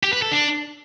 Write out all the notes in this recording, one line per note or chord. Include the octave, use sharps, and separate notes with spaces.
G4
B4
A4
D4